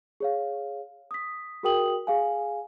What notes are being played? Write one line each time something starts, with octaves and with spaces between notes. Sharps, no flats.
G#4 C#5 F5
D#6 B6
F#4 G#4 A#4 G5 D#6 F#7
G#4 F5 G#5